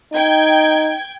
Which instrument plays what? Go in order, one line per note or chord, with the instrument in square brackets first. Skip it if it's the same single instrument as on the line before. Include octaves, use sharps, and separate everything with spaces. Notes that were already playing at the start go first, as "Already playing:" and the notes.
[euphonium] D#4 [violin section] G5 G#6